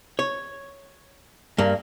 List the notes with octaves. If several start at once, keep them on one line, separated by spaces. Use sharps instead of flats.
C#5
G2 A#3